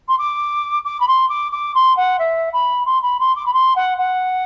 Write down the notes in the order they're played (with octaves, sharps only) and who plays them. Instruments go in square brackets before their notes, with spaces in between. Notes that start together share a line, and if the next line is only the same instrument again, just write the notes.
[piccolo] C6
D6
D6
B5
C6
D6
D6
C6
F#5
E5
B5
C6
B5
C6
D6
B5
C6
F#5
F#5